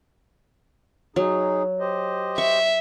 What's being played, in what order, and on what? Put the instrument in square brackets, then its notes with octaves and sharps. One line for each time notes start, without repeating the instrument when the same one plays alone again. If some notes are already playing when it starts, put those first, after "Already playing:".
[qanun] F#3 [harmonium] D#4 G#4
[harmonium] G4 C5 D#5
[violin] E5 [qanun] C#6